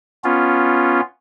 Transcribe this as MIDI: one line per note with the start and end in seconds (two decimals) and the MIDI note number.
0.24 1.01 59
0.24 1.01 61
0.24 1.01 65